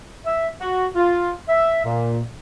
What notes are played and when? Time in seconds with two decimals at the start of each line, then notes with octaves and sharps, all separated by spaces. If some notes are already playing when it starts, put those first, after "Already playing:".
0.26 E5
0.61 F#4
0.96 F4
1.49 E5
1.84 A#2